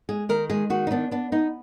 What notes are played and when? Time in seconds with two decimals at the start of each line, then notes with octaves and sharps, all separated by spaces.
0.09 G#3 G#4
0.29 D#3 A#4
0.50 G#3 G#4
0.70 D#3 F#4
0.87 D#4
0.91 B3 D4
1.11 B3 D4
1.32 B3 D#4